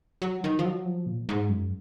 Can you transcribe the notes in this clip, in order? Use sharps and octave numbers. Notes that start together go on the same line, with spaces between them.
F#3
D#3
F3
F#3
F3
A#2
G#2
F#2